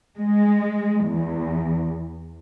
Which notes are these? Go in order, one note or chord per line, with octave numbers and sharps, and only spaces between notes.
G#3
E2